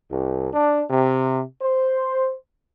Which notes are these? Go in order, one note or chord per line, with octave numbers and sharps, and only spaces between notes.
C2
D4
C3
C5